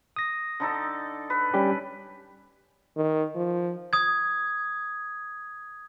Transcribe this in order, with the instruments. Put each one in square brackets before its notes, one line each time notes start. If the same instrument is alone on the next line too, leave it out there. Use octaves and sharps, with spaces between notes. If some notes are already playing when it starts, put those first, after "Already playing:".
[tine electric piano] D#6 A#6
[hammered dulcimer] D3 D#4 A4
B4
[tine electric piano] G3 C#4 G4
[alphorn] D#3
F3
[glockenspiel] D#6 G#6